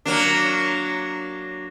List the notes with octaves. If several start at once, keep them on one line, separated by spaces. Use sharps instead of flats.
F#3 A#3 D4